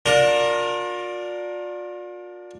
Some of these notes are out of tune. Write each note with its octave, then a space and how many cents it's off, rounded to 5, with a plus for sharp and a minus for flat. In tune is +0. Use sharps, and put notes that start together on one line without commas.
D4 +0 F4 +40 A#4 +0